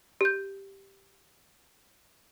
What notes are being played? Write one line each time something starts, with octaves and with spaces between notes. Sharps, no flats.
G4 G6